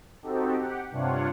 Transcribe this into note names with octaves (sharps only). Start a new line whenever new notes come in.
C4 D#4 F#4 G4 A4
G4 F#5
G2 C3 D4 F4 C#5 F#5